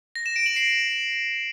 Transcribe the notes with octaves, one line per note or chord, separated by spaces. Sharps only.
A#6
E7
D7
F#7
C7